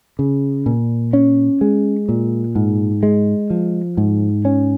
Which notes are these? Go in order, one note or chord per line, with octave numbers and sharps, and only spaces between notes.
C#3
A#2
C#4
G#3
A#2
G#2
G#3
F3
G#2
C#4